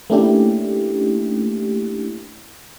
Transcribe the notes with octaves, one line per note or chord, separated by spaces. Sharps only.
A3 A#3 C#4 D4 E4 G4